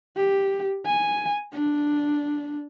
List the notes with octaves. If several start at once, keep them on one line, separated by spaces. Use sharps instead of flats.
G4
G#5
D4